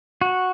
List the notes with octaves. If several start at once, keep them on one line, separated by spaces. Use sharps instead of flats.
F#4